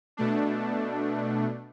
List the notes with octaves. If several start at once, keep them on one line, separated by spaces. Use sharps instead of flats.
B2 A3 D4